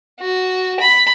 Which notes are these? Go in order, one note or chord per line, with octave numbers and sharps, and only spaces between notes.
F#4
B5